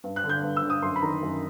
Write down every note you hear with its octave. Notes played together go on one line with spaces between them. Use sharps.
G2
F#6
D3
G6
G2
E6
D3
D#6
F#2 C6
B5
D#3 A#5
F#2